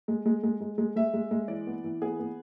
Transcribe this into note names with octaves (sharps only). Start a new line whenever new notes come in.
G#3
G#3
G#3
G#3
G#3
G#3 E5
G#3
G#3
E3 D5
B3
E3
B3 G#4
B3